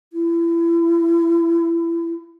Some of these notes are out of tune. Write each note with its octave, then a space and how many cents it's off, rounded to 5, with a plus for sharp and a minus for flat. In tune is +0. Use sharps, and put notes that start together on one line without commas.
E4 +30